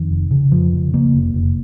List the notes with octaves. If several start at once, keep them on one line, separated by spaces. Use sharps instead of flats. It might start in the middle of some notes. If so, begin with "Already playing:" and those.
Already playing: F2 D#3
F1
C#3
F2 F3
C#3
C#3 A#3
F1
F1